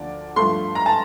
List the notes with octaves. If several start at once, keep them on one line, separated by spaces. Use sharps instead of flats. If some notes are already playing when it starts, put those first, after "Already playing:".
Already playing: D2 D3 F3 A#3 D5
G2 F3 A3 C6
A#5
A5